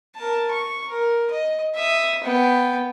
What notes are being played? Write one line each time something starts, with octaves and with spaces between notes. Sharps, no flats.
A#4 A5
C#6
A#4
D#5
E5 D#6
B3 G5